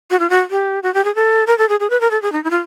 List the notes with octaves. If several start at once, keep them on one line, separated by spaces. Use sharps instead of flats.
F#4
F4
F#4
G4
F#4
G4
G#4
A4
A#4
A4
G#4
G#4
B4
A#4
A4
G#4
D#4
E4
F4